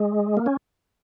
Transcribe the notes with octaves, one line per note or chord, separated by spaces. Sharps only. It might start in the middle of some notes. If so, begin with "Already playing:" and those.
Already playing: G#3
A#3
C#4